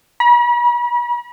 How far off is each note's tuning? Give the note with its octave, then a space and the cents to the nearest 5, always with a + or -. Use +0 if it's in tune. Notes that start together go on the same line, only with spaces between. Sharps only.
B5 -45